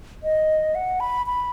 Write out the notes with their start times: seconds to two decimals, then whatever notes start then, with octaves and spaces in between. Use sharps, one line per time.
0.24 D#5
0.75 F#5
1.00 B5
1.26 B5